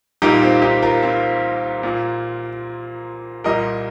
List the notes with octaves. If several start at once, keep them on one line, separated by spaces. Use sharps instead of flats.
C2 A#2 G3 A#3 D#4 G4
C4 F4
D#4 G4
F4 A#4
C4 F4
A#2 A#3
C2 A#2 G3 A#4 D#5